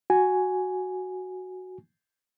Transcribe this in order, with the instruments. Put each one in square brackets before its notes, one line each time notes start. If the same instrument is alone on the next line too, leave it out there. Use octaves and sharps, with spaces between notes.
[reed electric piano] F#4 G#5